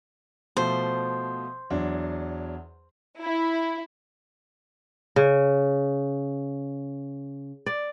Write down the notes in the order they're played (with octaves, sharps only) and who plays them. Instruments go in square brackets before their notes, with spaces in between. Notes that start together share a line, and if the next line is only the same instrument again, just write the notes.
[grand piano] B2 F3 A3 [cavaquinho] C5
[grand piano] E2 F#3 D4
[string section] E4
[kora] C#3
D5